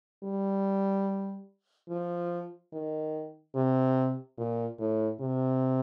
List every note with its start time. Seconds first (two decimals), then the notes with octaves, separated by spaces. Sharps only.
0.24 G3
1.90 F3
2.73 D#3
3.56 C3
4.38 A#2
4.79 A2
5.21 C3